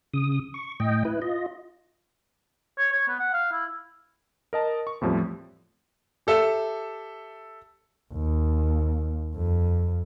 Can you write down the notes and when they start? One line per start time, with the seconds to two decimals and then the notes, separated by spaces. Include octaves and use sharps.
0.13 C#3 D#6
0.54 C#6
0.80 A2 D#5 G5
1.05 E4 B4
1.22 F4 D#5
2.78 C#5
2.92 C#5
3.08 B3
3.19 F#5
3.34 F5
3.52 E4
4.53 A#4 D#5 A5
4.87 C#6
5.01 E2 A2 F3 G3 C4
6.27 G4 A4 E5 E6
8.13 D#2
9.36 F2